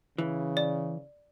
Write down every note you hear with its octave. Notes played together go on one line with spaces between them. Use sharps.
C#3 E3
D5